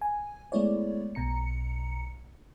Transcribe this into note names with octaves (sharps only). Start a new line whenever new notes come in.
G#5
G#3 A3 B3 E4 C#5 D5
B1 B2 A#5 C#7